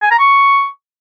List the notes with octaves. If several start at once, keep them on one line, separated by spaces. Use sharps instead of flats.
G#5
A#5
C#6